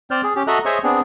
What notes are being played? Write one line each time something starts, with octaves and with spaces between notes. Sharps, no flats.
C4 C5 D5 F6 G6
G#4
C#4 G4
F#4 A4 D#5 E5 A#5 F#6
G#4 C5 C#5 D#5 E5 C#6
B3 C4 D4 G#4